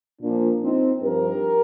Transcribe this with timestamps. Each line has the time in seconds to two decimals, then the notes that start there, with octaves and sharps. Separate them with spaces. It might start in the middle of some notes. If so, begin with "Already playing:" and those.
0.21 A#2 F3 A#3 D4
0.62 C4 D#4
1.02 G2 F3 G4 A#4